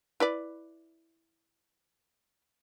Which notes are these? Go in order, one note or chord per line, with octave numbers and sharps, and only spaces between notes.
E4 B4 D5